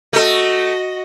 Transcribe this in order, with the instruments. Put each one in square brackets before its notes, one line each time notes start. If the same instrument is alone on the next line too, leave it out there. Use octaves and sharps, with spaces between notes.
[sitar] A3 A4 [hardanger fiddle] F#4 D#5